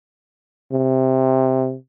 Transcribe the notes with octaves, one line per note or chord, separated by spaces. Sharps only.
C3